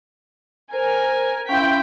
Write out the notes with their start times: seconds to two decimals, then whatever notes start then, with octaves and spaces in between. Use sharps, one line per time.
0.73 A#4 C5 G#5
1.49 C#4 E4 F5 G5 C6 B6